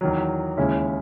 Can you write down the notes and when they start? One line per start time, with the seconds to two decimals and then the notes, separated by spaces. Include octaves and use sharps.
0.01 E2 D#3 F#3
0.57 D#2 C#3 G#3 C#4 E4